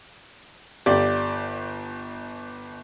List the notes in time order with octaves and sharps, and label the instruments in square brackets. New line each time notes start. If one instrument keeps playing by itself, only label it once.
[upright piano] G1 G4 D5